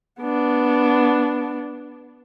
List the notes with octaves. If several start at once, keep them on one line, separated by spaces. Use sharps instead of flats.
B3 D4